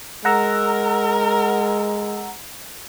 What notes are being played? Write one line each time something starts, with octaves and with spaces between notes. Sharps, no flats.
G#3 A#4 F#5 A#5 E6